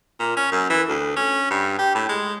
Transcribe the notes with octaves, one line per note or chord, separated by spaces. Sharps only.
A#2
C#4
F#2
E3
D2
C#4
G2
G4
A2
G#3